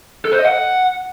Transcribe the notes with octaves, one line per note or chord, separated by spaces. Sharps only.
A4
C5
D#5
F#5